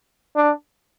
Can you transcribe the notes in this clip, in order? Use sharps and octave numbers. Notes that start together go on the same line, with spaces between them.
D4